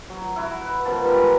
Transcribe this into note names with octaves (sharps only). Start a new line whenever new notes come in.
F#3
E4 F#4
B4
B2 D#3 F3 A5
D#3 G3 G#3 D4
C#5 A#5